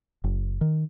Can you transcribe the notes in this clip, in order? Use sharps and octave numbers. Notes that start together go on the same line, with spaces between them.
F#1
D#3